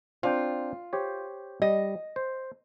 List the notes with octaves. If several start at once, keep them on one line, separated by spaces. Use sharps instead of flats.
C4 D4 F4 G5
G4 C5 C#5
G3 D#5
C5